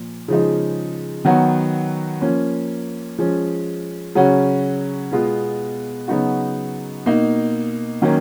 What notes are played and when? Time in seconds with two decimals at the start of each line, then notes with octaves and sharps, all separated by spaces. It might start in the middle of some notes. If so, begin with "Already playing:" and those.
Already playing: A#2 F3
0.28 C#3 F3 G#3 D#4
1.25 D#3 F#3 B3 F#4
2.21 F3 A#3 C#4
3.18 F3 G#3 C#4
4.15 C#3 F#3 C#4 F#4
5.12 B2 G#3 B3 F4
6.08 C#3 F#3 B3 D#4 F#4
7.06 B2 A#3 D#4
8.02 D#3 F#3 A#3 C#4